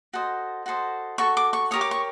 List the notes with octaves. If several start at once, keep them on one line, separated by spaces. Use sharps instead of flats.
F#4 A4 C5 D#5
F#4 A4 C5 D#5
F#4 A4 C#6
D6
C#6
G4 A#4 C#5 D#6
D6
C#6